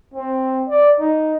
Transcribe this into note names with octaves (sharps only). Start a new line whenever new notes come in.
C4
D5
D#4